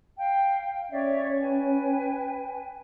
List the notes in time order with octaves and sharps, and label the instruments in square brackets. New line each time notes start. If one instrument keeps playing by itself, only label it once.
[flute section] F5 G5
[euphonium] C#4 [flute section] C#5 D5 E5
[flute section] B4 G5 G#5